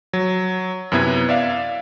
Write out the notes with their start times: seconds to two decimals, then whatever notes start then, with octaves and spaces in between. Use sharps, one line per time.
0.13 F#3
0.92 F#2 C3 B3 E4 G#6
1.29 D5 E5 F5